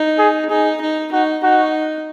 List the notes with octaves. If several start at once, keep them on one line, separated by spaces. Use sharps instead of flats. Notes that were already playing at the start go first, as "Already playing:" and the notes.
Already playing: D#4
G#4
D#4 G#4
D#4
D#4 F#4
D#4 F#4